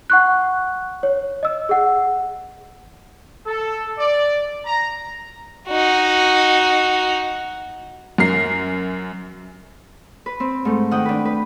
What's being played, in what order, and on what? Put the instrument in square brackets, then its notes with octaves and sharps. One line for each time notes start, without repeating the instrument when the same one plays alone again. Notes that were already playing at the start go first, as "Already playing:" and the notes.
[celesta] F#5 C#6 F#6
C#5
D#5 E6
G#4 F#5
[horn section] A4
D5
A#5
[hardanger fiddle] D#4 F#4
[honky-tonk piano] F#2 A#4 C7
[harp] B4
C4
G#2 A3
D#3 F#5 G5 D#6
D4 B4
B4